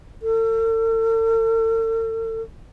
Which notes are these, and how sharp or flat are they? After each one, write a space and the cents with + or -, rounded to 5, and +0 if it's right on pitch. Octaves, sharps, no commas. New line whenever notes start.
A4 +45